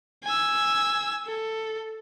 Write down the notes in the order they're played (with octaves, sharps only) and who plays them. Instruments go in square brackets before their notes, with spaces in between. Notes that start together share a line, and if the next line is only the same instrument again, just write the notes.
[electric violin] G#5 E6
A4